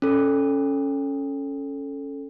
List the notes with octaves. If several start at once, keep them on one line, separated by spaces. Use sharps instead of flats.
C#4 A4